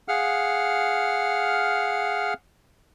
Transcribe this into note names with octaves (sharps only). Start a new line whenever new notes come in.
G#4 F5 F#5 F6